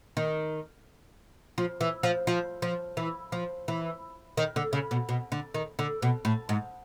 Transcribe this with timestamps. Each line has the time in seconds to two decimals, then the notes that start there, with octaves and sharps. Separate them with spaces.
0.17 D#3
1.58 F3
1.81 E3
2.03 F3
2.27 F3
2.62 F3
2.97 E3
3.32 F3
3.68 E3
4.37 D#3
4.56 D3
4.73 C#3
4.91 B2
5.09 B2
5.32 D3
5.54 D#3
5.79 D3
6.02 B2
6.25 A2
6.49 G#2